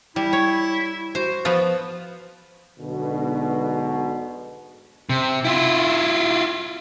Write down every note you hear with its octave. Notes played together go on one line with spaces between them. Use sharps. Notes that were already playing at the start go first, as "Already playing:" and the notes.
G3 E4
C#5
F#4 C5
F3 B3 F4
B1 G#2 B2 D3
C3
E4 F4